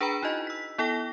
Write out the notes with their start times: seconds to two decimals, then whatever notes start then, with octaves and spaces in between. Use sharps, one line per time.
0.01 D4 G#4 B4 G5 A#5 B5
0.22 D#4 E4 F#4 D#5
0.47 E6 B6
0.78 B3 E4 A4 G5 A#6 G7